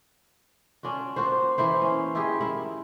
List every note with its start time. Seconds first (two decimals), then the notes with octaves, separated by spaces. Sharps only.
0.83 C#4 D4 F4 F#4
1.16 A#3 F4 F#4 C5
1.58 E3 A#3 E4 C5
1.82 C#4
2.15 E4 F4 G4 G#4
2.41 E4 A#4